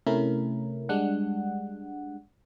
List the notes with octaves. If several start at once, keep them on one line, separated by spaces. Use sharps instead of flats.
C3 A3 C#4 E4 A#4
G3 G#3 D4 F#5